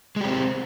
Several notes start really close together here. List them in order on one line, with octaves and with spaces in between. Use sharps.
G#3 G4 C4